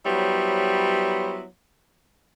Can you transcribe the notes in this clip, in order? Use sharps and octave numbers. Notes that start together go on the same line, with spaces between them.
F#3 G3 B3 E4 C5 C#5